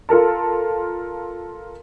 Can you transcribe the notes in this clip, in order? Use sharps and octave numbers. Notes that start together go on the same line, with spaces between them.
F4 A4 A#4 A5